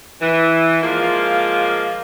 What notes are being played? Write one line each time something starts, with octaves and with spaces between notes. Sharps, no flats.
E3
F3 G#3 A#3 F4